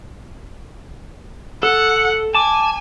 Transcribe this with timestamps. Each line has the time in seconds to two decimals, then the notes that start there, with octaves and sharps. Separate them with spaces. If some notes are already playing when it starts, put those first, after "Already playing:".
1.63 A4 F#5
2.35 G#5 A5 D6